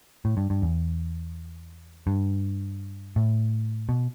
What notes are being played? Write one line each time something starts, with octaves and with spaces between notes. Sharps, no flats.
A2
G2
G2
E2
G2
A2
B2